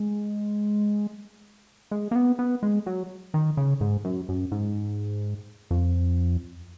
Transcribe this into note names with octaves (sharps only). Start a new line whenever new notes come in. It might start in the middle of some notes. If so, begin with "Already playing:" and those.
Already playing: G#3
G#3
A#3
B3
B3
G#3
F#3
D#3
C#3
G#2
F#2
F#2
G#2
F2